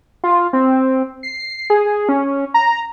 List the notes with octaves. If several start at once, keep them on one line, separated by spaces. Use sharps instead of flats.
F4
C4
C7
G#4
C#4
A#5